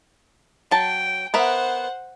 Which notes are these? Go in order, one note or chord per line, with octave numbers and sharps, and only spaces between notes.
F#3 G5 A5
B3 A#4 C5 E5 F#5